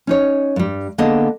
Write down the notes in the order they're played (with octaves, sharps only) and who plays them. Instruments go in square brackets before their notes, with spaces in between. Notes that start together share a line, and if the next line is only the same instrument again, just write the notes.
[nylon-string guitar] C#4 D#4 C#5
G2 G3
D3 A#3 B3 G#4 D#5 A5